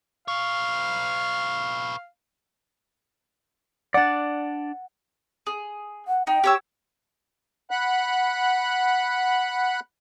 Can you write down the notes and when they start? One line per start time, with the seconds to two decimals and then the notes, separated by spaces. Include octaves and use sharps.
0.28 B4 C#5 F5
3.94 D4 D5 F#5 A6
5.47 G#4
6.08 F#5
6.27 D#4 G5
6.44 G4 C#5 E6
7.71 F#5 B5 F#6